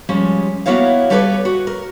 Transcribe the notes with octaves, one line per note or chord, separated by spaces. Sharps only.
F3 G3 G#3 C#4
A#3 B3 E4 F#4 C#5 F5
G3 G4 A4 B4 C#5 D5
F#4
A#4